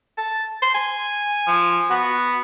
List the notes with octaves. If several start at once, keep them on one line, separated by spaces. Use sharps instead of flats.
A5
C6
G#5
F3
B3 F#4